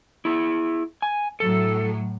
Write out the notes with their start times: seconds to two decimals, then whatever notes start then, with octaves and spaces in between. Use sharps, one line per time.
0.25 E4 G#4
1.02 G#5
1.40 A2 F#3 A4